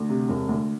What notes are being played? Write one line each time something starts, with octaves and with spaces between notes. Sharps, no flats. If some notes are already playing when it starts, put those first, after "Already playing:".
Already playing: D2
C3
E1
D2